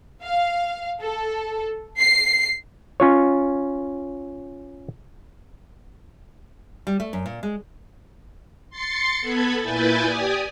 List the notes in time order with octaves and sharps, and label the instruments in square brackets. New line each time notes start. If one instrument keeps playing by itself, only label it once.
[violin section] F5
A4
C7
[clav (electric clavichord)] C#4 F4 C#5
[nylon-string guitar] G3
A3
F#2
A#2
G#3
[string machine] C6 A6 C7 C#7
B3 A4 B5 G#6
A#2 E4 B4 G#5 G6 A6
G4 D5 G#5 D#6